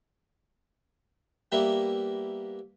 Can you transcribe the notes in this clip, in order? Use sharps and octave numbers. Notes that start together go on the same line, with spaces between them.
G3 A#3 B3 E4